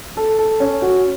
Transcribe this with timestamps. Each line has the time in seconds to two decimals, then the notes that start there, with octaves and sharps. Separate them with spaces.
0.17 A4
0.39 A4
0.60 C#4
0.82 F#4